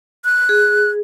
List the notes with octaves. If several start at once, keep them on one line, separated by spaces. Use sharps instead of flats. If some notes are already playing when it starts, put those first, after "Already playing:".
F#6
G#4